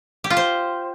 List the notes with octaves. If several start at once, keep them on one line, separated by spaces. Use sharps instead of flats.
G4
F4
C5